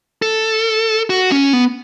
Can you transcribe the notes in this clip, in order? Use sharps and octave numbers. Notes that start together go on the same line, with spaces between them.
A4
F#4
C#4
B3